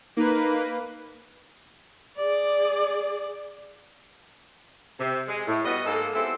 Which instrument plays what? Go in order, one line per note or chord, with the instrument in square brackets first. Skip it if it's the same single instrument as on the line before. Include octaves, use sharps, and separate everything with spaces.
[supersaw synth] A#3 B4 [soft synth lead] D#4
[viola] G#4 D5
[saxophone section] C3
G#3
A2
G3 B3 F#4 D#5
G#2 A#3 A4
G#3 B3 C4 E4 G4 A4